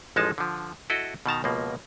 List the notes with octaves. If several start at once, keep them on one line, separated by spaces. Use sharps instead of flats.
A1 F3 G#3 D#4 A5
D3 F3
E4 F#4 A4 D#5
B2 D#3 A5 A#5
C#2 B2 F3 A#3